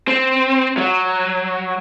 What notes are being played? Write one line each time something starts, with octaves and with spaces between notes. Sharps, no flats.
C4
F#3